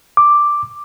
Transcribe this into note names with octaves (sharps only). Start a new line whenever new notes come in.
D6